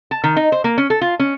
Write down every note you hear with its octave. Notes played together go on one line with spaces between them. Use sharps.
A5
D#3
D#4
C5
A#3
C#4
A4
F4
C#4